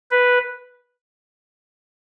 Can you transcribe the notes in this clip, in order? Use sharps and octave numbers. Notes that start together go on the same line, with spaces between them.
B4